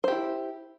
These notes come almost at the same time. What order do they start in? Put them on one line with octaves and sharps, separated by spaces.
C5 G4 E4